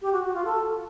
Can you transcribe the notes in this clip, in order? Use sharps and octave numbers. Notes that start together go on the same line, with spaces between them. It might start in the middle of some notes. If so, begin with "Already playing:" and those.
G4
F#4
F#4
F4
A4